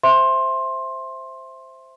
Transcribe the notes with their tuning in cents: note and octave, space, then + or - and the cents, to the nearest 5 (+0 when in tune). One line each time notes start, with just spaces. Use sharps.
C5 +0 E5 +5 C6 +15